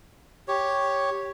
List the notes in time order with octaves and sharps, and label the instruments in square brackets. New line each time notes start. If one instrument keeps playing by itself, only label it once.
[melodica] G4 C#5